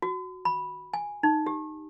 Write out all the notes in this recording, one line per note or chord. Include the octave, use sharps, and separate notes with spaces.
F#4
B5
G#5
D#4
G4